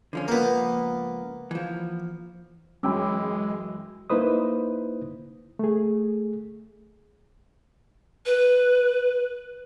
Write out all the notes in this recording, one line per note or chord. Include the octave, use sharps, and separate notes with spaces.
D3 F3 C#4
C#2 F3 A#3 B3
E3 F3
F#2 E3 G#3 C#4 G5 B5 D6 E6
A#3 D#4 E4 B4 C5 D#6
A3 G#4
B4